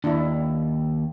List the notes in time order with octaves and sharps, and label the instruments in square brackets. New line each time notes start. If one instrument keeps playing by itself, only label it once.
[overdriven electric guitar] D#2 [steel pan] D4 E4